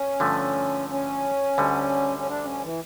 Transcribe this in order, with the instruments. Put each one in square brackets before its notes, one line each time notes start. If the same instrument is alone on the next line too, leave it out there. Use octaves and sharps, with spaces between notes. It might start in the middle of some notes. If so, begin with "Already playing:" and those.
Already playing: [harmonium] C#4
[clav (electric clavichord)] G2 D3 F3 A3
[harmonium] C#4
[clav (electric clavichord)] D2 D3 G3
[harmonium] C#4
D4
C#4
E3